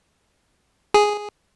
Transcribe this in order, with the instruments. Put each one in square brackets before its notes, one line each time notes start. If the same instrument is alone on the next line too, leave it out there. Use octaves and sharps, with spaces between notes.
[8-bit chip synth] G#4